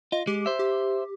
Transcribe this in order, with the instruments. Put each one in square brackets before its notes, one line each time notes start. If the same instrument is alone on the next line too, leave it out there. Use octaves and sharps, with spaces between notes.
[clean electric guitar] F4 [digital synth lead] D#5
[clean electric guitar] G#3 [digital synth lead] G4
[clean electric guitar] C5 E5
[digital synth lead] G4